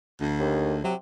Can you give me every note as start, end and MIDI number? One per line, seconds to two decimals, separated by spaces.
0.21 0.80 38
0.39 0.74 39
0.84 0.94 48
0.84 0.94 54